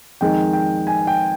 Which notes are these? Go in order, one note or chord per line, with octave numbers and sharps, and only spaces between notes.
F2 D#3 G#3 G5
G5
G#5
G5